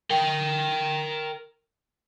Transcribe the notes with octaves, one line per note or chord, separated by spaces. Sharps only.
A#4 G5